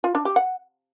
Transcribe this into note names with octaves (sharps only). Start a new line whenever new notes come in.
F4
D4
G4
F#5